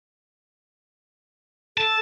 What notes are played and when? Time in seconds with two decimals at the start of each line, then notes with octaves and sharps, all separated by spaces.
1.78 A4 A5